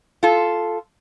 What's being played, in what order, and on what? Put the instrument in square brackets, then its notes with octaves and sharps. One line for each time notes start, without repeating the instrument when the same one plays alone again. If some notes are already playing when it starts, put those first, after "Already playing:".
[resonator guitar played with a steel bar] F4 A4